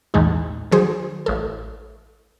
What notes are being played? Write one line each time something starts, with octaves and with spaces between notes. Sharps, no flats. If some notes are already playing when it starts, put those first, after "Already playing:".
A#1 E2 G#2 G#3 D#4
D#3 F#3 G#4 C5
A1 A4